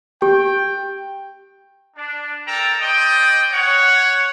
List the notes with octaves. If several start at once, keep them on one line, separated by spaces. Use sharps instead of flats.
G4 G5
D4
A4 A#4 G5 A5 A#5
A4 C5 D5 D#5 G5
C#5 F#5